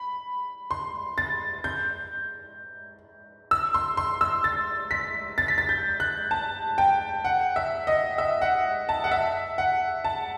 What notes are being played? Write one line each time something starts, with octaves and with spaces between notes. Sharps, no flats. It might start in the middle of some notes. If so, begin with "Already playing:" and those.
Already playing: B5
C6
A6
G6
E6
C6
C6
E6
A6
B6
A6
B6
A6
G6
F#6
A5
G5
F#5
E5
D#5
E5
F#5
A5
F#5
E5
F#5
A5